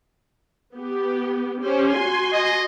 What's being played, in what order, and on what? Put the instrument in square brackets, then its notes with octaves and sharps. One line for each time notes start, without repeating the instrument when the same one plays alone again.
[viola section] B3 G4
C#4 G4 C5
F#4 G#5 C6
[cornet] D#5